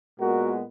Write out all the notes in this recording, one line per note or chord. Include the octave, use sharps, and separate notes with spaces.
A#2 G#3 B3 F#4 A#4